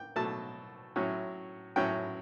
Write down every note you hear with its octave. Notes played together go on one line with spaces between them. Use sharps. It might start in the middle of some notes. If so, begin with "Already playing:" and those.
Already playing: G5
B2 F#3 A3 A5
A2 F#3 C#4 E4
A2 F#3 C#4 E4 G5